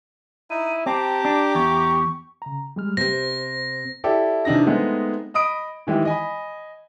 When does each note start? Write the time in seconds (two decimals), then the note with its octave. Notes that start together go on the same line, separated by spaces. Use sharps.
0.50 D#4 E4 D#7
0.86 C4 G4 A5 A#5 D6
1.25 D4
1.55 E2 C#6
2.42 C#3 A#5
2.76 G3 G#3 F6
2.97 C3 C4 C5 A#6
4.04 E4 G4 A4 D5
4.45 C3 E3 D4 D#4 A#6
4.67 G#3 A3 B3 C4 D#4 G#4
5.34 D#5 B5 D#6 D7
5.87 D#3 E3 G#3 G4
6.05 D#5 G#5 B5